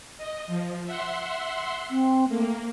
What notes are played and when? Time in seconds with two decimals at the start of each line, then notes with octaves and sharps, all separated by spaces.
0.18 D#5
0.47 F3
0.85 E5 F#5 C6
1.90 C4
2.29 A3 A#3